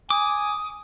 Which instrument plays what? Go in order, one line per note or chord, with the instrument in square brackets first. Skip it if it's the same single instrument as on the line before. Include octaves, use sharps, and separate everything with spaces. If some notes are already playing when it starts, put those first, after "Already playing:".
[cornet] G#5 [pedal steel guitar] D6 [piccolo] D#6